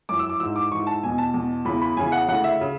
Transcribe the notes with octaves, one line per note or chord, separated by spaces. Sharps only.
F#2 E3 D6
E6
D6
G#2 E3 E6
D6
G#2 E3 C#6
A5
E2 B2 G#5
A5
E2 B2
E2 C#3 E3 B5
B5
E2 C#3 E3 G#5
F#5
D2 C#3 E3 F#5
E5
C#3